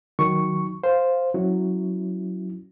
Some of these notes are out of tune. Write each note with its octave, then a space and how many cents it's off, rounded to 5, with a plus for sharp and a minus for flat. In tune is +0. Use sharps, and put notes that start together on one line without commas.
D#3 +0 F#3 +0 C#6 +0
C5 +0 F5 +0
F#3 +0 C#4 +0 E4 +0